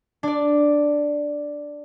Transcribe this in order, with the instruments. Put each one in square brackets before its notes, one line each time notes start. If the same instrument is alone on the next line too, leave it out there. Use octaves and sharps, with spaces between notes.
[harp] D4 D5